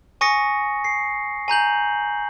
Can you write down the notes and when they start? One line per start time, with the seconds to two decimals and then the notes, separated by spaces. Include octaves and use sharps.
0.21 G#5 C#6 D#6 A#6 C#7
0.84 C7
1.48 G#5 A#5 G6 F#7